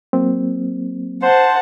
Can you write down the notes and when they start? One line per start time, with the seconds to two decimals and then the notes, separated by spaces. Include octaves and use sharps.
0.13 F#3 A#3 C4
1.23 C5 F#5 A5